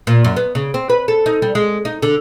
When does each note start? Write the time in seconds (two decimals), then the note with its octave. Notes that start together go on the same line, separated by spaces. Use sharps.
0.07 A#2
0.24 F#2
0.36 B3
0.55 C#3
0.74 C4
0.90 B4
1.08 A4
1.26 D#4
1.42 G3
1.55 G#3
1.85 D#4
2.02 D3